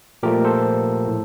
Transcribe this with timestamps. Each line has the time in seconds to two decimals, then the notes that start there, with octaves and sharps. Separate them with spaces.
0.23 A#2 F3 A3 G4 A#4
0.45 A4 C5
1.08 A2